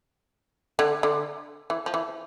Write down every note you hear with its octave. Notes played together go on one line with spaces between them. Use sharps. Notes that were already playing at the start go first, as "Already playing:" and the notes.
D3
D3
E3
F3
E3